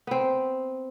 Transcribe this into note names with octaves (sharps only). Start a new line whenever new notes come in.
B3 C4